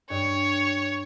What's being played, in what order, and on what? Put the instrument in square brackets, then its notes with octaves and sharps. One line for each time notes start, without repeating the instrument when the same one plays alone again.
[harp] G2 [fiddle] C#5